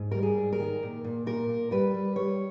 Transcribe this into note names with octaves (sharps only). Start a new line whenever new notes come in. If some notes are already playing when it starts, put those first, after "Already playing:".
Already playing: G#2
G3 A#4
G#4
G#2
A#4
D#3
A#2
A#2
A#2 A#4
A#2
G3 B4
G3
G3 C#5